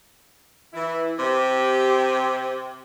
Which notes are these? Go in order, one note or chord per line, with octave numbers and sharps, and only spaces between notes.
E3 E4
C3 G4